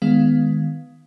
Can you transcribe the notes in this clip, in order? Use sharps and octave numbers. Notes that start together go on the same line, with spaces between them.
D#3 G#3 B3 F5